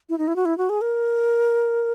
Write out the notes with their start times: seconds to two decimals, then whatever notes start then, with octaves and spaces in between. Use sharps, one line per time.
0.09 E4
0.18 D#4
0.28 E4
0.36 F#4
0.45 E4
0.58 F#4
0.69 G#4
0.81 A#4